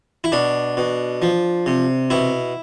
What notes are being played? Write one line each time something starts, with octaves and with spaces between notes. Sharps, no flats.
E4
B2 D4
B2
F3
C3
B2 E4